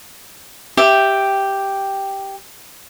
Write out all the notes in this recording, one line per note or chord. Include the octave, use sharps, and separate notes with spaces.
G4 E5 G5